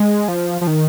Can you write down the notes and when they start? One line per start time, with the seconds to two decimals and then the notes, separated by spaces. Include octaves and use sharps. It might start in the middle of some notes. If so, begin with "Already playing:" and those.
Already playing: G#3
0.28 F3
0.61 F3
0.67 D#3